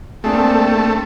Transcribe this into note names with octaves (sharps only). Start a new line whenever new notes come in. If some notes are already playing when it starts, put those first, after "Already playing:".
A3 A#3 C4 D4 G#4 A5